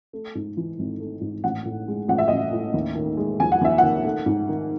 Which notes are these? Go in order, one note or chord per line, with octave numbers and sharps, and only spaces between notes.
A3
G#2
E3
G#1
A3
G#2
A1 F#5
A2
G#3
A1 F#5
E5
A1 D#5
E5
A2
D#2
D#3
G#3
D#2 G#5
F#5
D#2 E5
D#3 F#5
A3
G#2
D#3